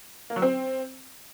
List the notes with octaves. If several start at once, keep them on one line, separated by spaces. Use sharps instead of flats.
A#3
F#3
C4